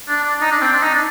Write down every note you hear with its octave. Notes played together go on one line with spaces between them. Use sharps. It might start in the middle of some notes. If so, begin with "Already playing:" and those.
D4
D4
D#4
D4
C4
D4
D#4
D4